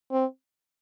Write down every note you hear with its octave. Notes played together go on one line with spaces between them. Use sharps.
C4